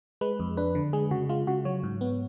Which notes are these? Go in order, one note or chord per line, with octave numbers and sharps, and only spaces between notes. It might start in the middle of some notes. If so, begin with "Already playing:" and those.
G#3 B4
F2
D4 B4
D3
G#3 G#4
C#3 F#4
G#3 F4
C#3 F#4
F#3 C#5
G#2
B3